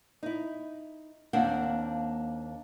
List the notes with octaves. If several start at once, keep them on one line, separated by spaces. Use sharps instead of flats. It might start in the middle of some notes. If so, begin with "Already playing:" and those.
D#4 E4
D#2 A#3 C4 D4 F#5